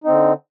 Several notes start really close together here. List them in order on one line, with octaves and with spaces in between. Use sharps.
D#4 C4 D3